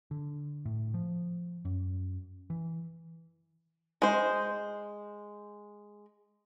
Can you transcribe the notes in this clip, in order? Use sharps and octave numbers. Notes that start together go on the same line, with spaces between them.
D3
A2
F3
F#2
E3
G#3 C5